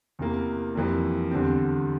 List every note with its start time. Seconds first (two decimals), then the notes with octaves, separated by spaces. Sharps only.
0.19 E2 C3 E3 A#3
0.75 F2 E3 G3 A#3
1.31 E2 D3 G3 C4